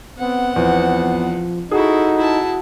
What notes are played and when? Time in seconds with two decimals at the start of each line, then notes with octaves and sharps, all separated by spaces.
0.19 B3 C4 F#5
0.56 E2 F3 B3
1.71 D#4 E4 F#4 G#4 A4
2.17 E4 A5